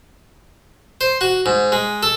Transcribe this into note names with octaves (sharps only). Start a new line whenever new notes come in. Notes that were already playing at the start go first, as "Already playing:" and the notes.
C5
F#4
G#2
G#3
A4